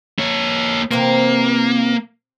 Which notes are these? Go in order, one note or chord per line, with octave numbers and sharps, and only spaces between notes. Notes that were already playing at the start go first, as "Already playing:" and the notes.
A#3 C#5
C3 E3 A#3 C4